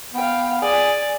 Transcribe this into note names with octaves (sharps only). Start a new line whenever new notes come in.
B3 F5 G5
G#4 D5 G#5